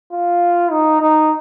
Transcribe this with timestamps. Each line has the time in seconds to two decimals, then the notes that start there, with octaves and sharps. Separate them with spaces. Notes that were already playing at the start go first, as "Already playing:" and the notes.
0.12 F4
0.71 D#4
1.01 D#4